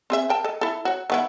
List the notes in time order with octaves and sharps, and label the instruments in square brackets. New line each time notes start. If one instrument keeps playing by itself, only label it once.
[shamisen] C4 G#4 E5
A#4 G5 A5
A4 D#5
E4 A4
F#4 C#5
D#3 B3 E4